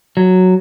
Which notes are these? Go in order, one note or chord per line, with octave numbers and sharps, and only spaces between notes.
F#3